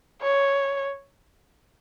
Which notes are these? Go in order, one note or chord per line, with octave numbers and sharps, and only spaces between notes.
C#5